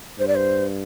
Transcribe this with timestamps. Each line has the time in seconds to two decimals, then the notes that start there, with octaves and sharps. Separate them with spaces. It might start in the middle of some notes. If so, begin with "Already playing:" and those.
0.19 G2 C5
0.28 D5
0.35 C5